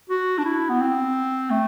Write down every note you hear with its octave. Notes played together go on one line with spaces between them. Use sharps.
F#4
D4
E4
B3
C4
A3